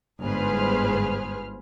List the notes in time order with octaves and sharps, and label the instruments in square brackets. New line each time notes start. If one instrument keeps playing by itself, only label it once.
[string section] G1 G#2 G#4 B4 C5 F6